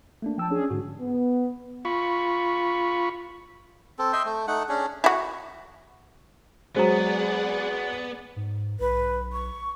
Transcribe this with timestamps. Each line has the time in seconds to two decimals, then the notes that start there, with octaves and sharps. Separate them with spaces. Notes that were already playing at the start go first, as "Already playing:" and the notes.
0.22 A3 A#3 D4
0.38 F3 G5 A5 E6
0.49 C#4 D4 G#4
0.70 G#2 D3 F#4
1.00 B3
1.85 F4 B5 C#6
3.99 C4 A4
4.13 D#5 E5 G5 C6
4.25 A3
4.48 A3 D#4 F#5
4.69 C#4 D4 G#4
5.04 E4 F#4
6.76 F#3 G#3 B3 G#4 C5 D5 F#5 A#5
8.36 G#2
8.80 B1 B4
9.33 C#6